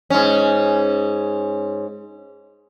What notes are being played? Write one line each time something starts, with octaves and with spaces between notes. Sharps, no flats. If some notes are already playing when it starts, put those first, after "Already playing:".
G#2 C#4